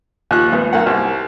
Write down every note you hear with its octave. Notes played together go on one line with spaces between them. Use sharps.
D#2 F3 F#6
G#1 B3
B1 A#3 F#5
C2